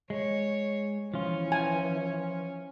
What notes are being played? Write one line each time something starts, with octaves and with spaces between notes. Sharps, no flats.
G#3 C#5
E3 F3 C#4 F4
G#5